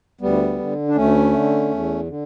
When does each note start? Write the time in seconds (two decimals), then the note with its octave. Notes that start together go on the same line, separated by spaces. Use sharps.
0.21 D2 G3 B3
0.59 D3
0.88 D4
0.96 D2 A3 C#4
1.34 D3
1.71 E2
2.08 D3